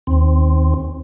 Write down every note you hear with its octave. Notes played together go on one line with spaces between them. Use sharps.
D#2 C4